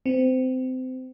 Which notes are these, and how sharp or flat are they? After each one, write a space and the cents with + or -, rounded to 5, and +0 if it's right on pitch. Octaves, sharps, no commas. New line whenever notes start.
C4 -25